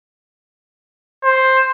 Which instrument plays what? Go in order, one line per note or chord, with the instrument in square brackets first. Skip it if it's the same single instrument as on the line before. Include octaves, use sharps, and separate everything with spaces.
[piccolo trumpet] C5